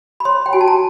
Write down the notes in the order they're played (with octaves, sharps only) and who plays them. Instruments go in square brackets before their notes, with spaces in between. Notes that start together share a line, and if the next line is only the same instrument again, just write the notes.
[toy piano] B5
C#5 C6
G5
F#4 G#5
A5
A#5